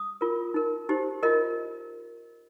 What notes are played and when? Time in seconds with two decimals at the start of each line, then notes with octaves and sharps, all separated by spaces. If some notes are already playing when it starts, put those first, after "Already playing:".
Already playing: D#6
0.21 F4 A#4
0.54 D#4 A#4
0.89 D#4 G4 C5
1.23 F4 A#4 D#5